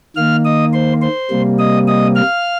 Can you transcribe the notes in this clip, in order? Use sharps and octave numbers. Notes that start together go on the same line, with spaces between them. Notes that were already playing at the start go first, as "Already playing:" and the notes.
D#3 A#3 F5 F6
D#5 D#6
C5 C6
C5 C6
C3 G3 A#3
D#5 D#6
D#5 D#6
F5 F6